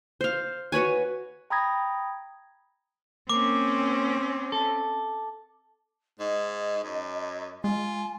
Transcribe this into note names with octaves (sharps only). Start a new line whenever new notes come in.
C5 F5
F#4 B4 C#5 G#5
G5 A#5 B5 D#6 G#6 A#6
A#3 C4 C#4 D6
A4
G#2 D#5
F#2
G#3 F4 G#5